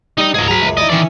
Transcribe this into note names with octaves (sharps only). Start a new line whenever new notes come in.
G3 D#4 D#5
C#2 G#2 G#4 A#4
F#3 G#4 B4 A#5
C#2 F#2
D#4 E4 D5 D#5
D#3 E3 C#4 D5